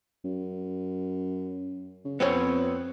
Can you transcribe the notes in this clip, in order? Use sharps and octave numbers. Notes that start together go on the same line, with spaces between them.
F#2
C#3
F2 B3 C4 C#5